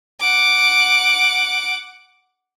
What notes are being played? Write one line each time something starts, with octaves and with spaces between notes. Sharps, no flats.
F#5 D6